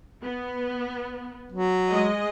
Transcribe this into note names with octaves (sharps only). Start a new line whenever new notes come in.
B3
F#3
G#3 D#5